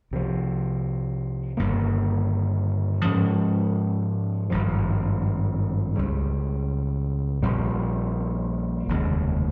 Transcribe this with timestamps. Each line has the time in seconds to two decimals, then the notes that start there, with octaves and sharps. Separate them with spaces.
0.11 C2 C3 F3
1.57 G1 G2 D#3 A#3
3.04 G#2 F3 G#3 C#4
4.50 G#1 G2 F3
5.96 C#2 C#3 G3
7.42 A#1 A#2 G3 C4
8.88 F1 D#2 C#3 G#3